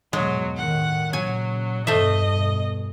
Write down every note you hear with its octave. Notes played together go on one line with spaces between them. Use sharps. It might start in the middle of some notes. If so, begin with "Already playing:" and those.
E2 G#2 B2 F#3 G#3
A2 D#3 F#5
A#2 C#3 F#3 G#5
E2 G2 B2 A3 C5 D#5 E5